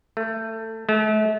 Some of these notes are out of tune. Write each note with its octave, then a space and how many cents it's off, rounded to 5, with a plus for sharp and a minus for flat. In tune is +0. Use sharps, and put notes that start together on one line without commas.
A3 +20
A3 -40